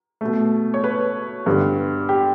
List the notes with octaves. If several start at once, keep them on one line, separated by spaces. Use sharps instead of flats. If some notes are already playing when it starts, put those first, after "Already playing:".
B2 A3
C#5
B4
G2 D3 G3 B3
G4